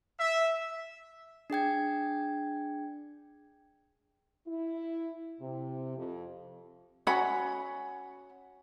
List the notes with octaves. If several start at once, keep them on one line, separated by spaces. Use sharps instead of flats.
E5
D4 G#4 G5 G#6
E4
C3
F2
C#4 F#4 F#5 B5